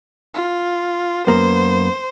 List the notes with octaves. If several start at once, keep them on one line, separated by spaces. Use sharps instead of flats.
F4
F#2 A#3 B3 C5